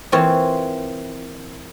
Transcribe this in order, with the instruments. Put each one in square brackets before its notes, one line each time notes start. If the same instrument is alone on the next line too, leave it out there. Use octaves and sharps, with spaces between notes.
[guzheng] E3 A#3 C4 F4 C5 C#5